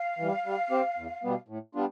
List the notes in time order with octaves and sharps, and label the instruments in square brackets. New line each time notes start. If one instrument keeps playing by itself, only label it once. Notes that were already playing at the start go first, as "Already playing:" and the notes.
Already playing: [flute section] F5
[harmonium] E3 G3
G3
C4 G4 C5
E2
B2 G3 B3
A2
G3 B3 D4 F4